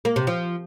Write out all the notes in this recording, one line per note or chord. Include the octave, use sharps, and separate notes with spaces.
A#3
C3
F3